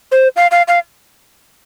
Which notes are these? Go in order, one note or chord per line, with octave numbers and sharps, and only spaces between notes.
C5
F5
F5
F5